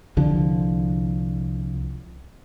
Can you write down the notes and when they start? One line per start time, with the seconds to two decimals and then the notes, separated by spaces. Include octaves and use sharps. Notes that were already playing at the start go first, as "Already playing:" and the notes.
0.17 C2 D3 F3